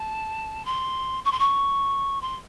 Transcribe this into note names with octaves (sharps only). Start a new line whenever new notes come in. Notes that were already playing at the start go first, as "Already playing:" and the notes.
Already playing: A5
C6
C#6
C6
C#6
C6